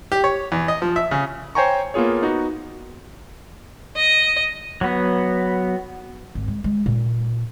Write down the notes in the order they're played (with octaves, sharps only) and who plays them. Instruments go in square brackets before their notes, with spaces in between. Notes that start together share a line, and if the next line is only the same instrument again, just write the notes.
[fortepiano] G4
C#5
E2
D#5
F3
E5
C#3
[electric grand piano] C5 C#5 G5 G#5 A#5 C#6
A#3 B3 F4 G#4 C#5
B3 D#4 F#4
[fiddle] D#5
[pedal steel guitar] F#3 B3
[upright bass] G#1
G#3
G#3
A#2